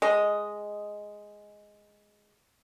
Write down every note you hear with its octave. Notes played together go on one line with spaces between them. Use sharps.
G#3 D#5